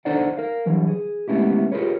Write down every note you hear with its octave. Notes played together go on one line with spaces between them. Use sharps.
D4 D#4 A4 C5 D5 F#5
A#4 F5
D3 E3 F#3 G3
G#4
G#3 A3 B3 C#4 E4 G4
F4 G4 G#4 A#4 B4 C#5